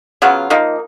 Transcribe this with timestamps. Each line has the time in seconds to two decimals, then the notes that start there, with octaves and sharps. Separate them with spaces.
0.22 C#3 F#3 B3 F4
0.50 F3 A#3 D#4